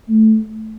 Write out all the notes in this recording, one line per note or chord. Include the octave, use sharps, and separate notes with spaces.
A3